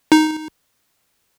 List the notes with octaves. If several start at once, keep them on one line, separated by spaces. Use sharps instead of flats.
D#4